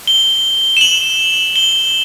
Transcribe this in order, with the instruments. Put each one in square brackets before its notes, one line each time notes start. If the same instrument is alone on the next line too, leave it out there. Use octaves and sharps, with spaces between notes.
[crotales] G7
E7
F#7
G7